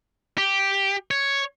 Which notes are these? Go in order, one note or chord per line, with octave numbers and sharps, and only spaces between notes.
G4
C#5